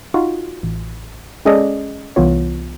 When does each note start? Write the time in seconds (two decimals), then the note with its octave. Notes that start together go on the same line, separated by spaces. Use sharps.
0.14 D#4 F4 F#4
0.63 A1
1.45 G#3 C#4 G#4 A4 D5 D#5
2.16 C2 E3 B3 F4 C#5